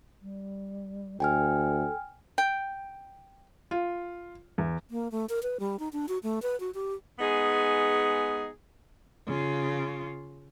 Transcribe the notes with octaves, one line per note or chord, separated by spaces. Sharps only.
G3
D2 A4 G5 G#5 F6
G5
F4
E2
A#3
A3
A#4
B4
G3
D#4
D4
F#4
A3
B4
F#4
G4
G#3 B3 D#4 G#4
C#3 F4